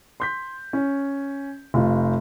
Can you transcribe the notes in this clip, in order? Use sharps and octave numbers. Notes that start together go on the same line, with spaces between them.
C6 G6 B6
C#4
F1 F4